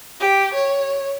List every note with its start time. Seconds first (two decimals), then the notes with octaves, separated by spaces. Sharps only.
0.21 G4
0.54 C#5